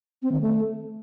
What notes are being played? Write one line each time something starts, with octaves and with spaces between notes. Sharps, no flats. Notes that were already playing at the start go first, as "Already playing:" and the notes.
C4
D#3
A3